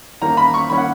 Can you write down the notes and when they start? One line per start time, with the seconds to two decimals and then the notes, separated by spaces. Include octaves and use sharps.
0.22 E2 D#3 A#3 C#4 A#5
0.37 B5
0.54 C#6
0.69 D#3 A#3 C#4 B5
0.78 F#5